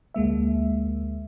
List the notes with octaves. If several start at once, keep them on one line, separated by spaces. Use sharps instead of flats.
D2 G#3 A#3 E5